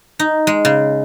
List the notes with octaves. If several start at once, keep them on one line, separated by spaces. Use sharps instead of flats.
D#4
G#3
C#3